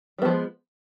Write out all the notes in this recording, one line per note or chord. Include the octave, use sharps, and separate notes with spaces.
F3 G3 G#3 B3